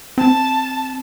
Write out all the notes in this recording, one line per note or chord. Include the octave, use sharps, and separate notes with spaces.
C4 A5